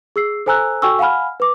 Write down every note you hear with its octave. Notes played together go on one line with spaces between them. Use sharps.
G#4 E6 C7
A4 C5 G#5 A#5 E6 F#6
F#4 A4 G5 G#5 C#6 E6
F5 F#5 G#5 B5 F6
B4 D6